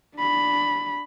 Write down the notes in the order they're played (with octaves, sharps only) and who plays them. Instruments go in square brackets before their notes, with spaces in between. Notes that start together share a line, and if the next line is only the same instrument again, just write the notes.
[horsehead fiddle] D4 B5